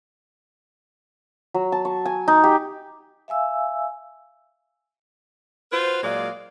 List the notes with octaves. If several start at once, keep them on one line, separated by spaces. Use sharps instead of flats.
F#3
A5
C#6
G#5
D#4
G4
E5 F5 G#5 E6
F4 F#4 B4 C5
A#2 F#3 G#3 D5 F5